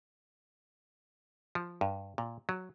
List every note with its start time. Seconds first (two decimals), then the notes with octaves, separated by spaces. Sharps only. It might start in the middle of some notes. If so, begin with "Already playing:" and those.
1.55 F3
1.81 G2
2.18 A#2
2.49 F#3